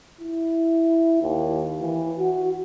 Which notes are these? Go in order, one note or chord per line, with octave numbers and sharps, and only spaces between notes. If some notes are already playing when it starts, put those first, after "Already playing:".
E4
D#2
E3
F#4